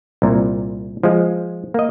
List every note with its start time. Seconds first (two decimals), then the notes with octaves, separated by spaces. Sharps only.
0.22 C2 A#2
1.03 F3 G#3
1.74 A#3 D#5